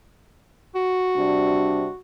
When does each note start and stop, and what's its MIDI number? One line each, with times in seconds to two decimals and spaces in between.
0.75 2.00 66
1.15 1.86 48
1.15 1.86 55
1.15 1.86 62